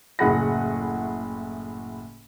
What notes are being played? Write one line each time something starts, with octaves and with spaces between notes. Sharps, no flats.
F#1 A2 G#4 F#5 B5 A#6